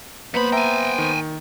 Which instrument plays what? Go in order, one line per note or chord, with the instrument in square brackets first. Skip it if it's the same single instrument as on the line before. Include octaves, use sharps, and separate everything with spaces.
[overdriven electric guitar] F2 B5 [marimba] A#3 B4 [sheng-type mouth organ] B3 C5
[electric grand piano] E5 A#5 [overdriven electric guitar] G5 G#5
[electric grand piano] D#3